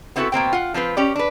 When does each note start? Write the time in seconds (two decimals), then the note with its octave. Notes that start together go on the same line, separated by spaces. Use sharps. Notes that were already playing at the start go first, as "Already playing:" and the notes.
0.16 B3 C4 E4 F#4 G#4 A4
0.32 B2 A#3 C4 G5
0.53 F4 F#5
0.74 F3 C4 F4 B4
0.97 C#4 G4 D5
1.16 D4 B4